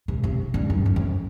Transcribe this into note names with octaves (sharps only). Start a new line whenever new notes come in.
C3
C3
G2
F#2
F#2
F2